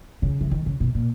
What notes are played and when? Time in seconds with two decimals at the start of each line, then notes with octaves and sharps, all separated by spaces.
0.22 C#3
0.41 E3
0.51 D#3
0.66 C#3
0.80 B2
0.95 A#2